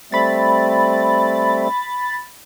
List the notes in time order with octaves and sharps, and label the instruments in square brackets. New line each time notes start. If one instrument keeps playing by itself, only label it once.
[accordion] G3 A3 C4 [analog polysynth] B5 A6